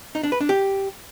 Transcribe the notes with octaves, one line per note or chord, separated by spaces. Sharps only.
D#4
D4
B4
D4
G4